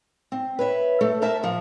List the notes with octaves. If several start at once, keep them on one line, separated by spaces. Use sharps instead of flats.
C4
B4 C#5 E5
A3 A4
A#4 C5 E5 A5
A#2 F3